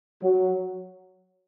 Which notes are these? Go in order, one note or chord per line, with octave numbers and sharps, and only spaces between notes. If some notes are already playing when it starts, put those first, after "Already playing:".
F#3